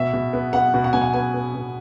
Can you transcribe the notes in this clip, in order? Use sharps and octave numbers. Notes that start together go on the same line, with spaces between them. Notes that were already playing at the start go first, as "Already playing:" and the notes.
Already playing: B2 E5
B2
B3
B3 F#5
B2
F#5
B2 G#5
F#5
B3 G#5
B3
B2